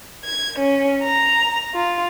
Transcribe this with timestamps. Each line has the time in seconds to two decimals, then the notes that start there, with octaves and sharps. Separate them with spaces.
0.25 G#6
0.59 C#4
1.04 A#5
1.75 F4